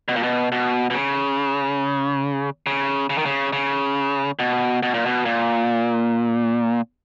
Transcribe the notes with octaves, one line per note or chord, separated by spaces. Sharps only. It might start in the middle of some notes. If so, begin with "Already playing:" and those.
B2
A#2
B2
B2
B2
C#3
C#3
C#3
D#3
C#3
C#3
B2
B2
A#2
B2
A#2